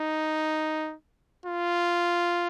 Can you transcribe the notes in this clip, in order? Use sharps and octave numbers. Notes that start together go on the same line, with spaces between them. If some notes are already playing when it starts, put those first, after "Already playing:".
Already playing: D#4
F4